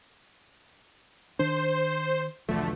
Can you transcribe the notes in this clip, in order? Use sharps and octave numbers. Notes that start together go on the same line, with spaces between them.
D#3 D4 C5
B1 E2 D3 F3 A3